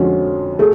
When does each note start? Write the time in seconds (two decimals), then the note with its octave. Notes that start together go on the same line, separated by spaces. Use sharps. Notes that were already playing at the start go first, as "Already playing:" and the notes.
Already playing: F2 D3 F3 G#3 C#4 F#4
0.59 A3 G#4